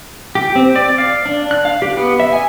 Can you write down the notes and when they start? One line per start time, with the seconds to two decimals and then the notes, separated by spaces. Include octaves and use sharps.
0.35 G4
0.56 C4
0.76 D5
0.98 F5
1.26 D4
1.51 F#6
1.65 F5
1.82 G4
1.97 B3
2.20 E5
2.33 G#5